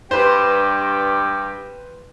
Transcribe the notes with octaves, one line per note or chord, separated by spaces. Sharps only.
G2 G4 B4 C5